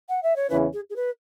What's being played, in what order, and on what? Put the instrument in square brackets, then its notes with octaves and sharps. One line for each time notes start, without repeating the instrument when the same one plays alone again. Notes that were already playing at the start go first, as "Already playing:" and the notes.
[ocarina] F#5
E5
C#5
[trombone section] E2 C#3 E3 C#4 E4 [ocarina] B4
[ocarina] G#4
G#4
B4